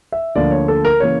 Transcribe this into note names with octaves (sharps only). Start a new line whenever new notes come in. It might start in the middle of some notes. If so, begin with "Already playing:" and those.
E5
D2 D3 F3 A#3 D5
C#5
A4
A#4
C#3 E3 A#3 C#5